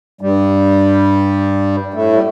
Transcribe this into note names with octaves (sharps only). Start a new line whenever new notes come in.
G2 G3
A2 A3
G3